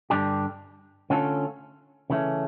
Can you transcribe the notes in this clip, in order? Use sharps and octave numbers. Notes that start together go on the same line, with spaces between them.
G2 D3 G3 D4 G4
D3 A3 C#4 F4 A4
C#3 E3 A3 C#4